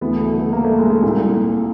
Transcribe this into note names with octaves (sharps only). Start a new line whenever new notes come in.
D2 C#3 E3 B3
A3
A3
A3
A#3
A3
G#3
A3
C2 A#2